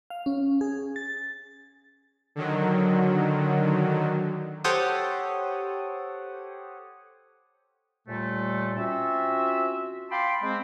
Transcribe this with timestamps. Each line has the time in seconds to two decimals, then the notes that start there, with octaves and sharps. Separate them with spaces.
0.10 F5
0.26 C#4
0.61 G#4
0.96 A6
2.36 D3 D#3 F#3
4.64 G4 A4 C5 C#5 F#5 D#6
8.08 D#2 A#2 G3 A3
8.77 C4 C#4 F4 F#4 E5
10.11 F5 G5 A5 B5 C6 D6
10.42 G#3 C4